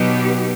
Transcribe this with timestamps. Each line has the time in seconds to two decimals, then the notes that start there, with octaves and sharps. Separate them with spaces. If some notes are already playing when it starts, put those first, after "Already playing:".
Already playing: B2 F#3 B3 D#4 G4